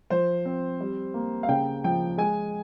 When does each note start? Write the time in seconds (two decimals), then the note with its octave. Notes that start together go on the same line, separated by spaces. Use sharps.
0.10 F3 C5
0.45 C4
0.80 G3
1.14 A#3
1.43 F5
1.49 C#3 G5
1.84 F3 G5
2.18 G#3 G#5